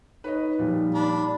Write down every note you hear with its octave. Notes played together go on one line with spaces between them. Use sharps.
D#4 B4 C#5 D#5
A#2 F3 G3
D4 B5